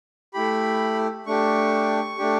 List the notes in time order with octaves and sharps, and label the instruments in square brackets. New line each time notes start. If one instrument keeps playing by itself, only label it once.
[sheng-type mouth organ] A3 E4 G4 B5
A3 D4 G4 C#6
A3 D4 G4